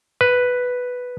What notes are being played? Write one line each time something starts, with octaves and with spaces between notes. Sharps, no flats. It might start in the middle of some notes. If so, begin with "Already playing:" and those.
B4